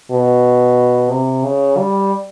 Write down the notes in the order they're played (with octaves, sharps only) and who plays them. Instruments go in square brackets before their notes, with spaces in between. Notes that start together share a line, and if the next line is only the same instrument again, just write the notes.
[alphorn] B2
C3
C#3
G3